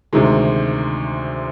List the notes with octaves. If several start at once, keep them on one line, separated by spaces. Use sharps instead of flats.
D2 C3 D#3 G#3